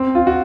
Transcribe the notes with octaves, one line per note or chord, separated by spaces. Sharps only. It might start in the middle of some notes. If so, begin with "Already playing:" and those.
Already playing: C4
F4
F#4